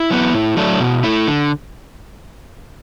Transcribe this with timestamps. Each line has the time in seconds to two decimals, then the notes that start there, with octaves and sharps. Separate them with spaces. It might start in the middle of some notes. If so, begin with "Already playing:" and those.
Already playing: E4
0.10 F#3 B3
0.33 A2
0.57 F#3 A3 D4
0.80 B2
1.03 A3 E4
1.27 D3